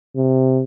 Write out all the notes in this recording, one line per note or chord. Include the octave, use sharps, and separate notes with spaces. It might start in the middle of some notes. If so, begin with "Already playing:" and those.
C3